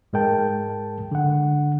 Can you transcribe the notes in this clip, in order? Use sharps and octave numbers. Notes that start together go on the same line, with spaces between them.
G#2 G#3 A#4 G5 A5
D3 F#5